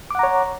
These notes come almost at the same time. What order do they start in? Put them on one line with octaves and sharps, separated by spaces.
D6 F#5 A#5 C#5